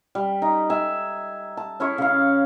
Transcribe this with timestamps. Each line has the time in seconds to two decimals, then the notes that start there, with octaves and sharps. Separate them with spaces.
0.15 G3
0.42 D#4
0.70 E5 G#5
1.57 A5
1.80 C#4 E4 G#4 C#5
1.98 C#3 F5